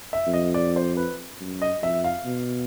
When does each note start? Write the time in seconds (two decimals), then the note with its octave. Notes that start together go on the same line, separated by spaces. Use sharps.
0.13 E5
0.27 F2
0.33 D#5
0.54 D5
0.76 C5
0.97 B4
1.41 F#2
1.62 D#5
1.82 F2 E5
2.04 F5
2.25 B2